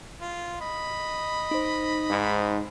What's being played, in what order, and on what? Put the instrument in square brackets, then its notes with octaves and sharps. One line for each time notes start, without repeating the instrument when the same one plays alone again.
[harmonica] F4
D#5 B5
[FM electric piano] D#4 C5
[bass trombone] G#2